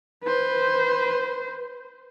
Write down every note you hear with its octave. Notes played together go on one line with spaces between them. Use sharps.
B4 C5